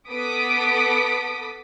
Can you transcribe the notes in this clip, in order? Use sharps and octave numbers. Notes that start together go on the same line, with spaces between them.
B3 A4 D6 D#6 B6 D7